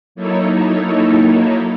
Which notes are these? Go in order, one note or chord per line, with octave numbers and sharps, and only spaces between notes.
F#3 A#3 D#4 E4 A4 C#5